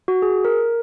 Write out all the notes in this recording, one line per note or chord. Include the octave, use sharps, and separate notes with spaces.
F#4
G#4
A#4